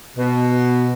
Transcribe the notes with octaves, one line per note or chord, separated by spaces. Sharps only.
B2